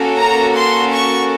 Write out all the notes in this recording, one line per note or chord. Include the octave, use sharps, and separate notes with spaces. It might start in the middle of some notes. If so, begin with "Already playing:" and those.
Already playing: A#3 C#4 F#4 A4
A#5
C6
C#6